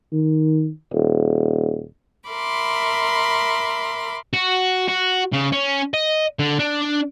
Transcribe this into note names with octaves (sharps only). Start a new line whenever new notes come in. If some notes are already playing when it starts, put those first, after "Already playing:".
D#3
D#1
A#4 E5 B5 C6 D6
F#4
F#4
C#3
C#4
D#5
D3
D4